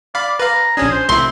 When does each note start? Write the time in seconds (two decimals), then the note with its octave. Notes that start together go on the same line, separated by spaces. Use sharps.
0.15 D5 F5 B5
0.40 B4 F5 A#5
0.77 A#1 C#4 D4 G#4
0.92 C5
1.09 C2 C4 E4 C6